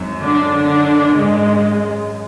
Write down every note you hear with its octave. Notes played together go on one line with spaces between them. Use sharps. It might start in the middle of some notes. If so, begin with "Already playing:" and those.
Already playing: G#1 F#2
D3 D4
D3 D4
G#2 G#3